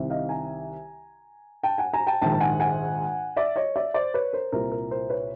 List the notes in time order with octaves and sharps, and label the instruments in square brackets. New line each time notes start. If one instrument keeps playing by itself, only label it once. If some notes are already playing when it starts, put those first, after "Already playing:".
Already playing: [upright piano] C2 C3 D#3
D#5 F5
G#5 A#5
G5 A5
F#5 G#5
G#5 A#5
G5 A5
A#1 G#2 D#3 G5 A5
A5
F#5 G#5
F#5 G#5
D5 E5
C#5 D#5
D5 E5
C5 D5
B4 C#5
A#4 C5
C2 A#2 A#4 C5
A#4
A#4 C5
B4 C#5